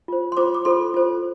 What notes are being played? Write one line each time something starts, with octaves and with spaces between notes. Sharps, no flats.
F4 C5
C6
F4 C5 D6
D6
F4 A4 C5 C6
F4 A4 C5